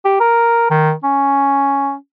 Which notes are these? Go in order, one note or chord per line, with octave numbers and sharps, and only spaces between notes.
G4
A#4
D#3
C#4